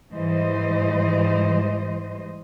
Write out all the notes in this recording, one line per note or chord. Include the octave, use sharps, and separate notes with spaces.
G#2 E3 G3 C5 D#5